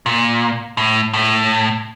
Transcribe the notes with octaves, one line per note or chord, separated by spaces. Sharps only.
A#2
A2
A2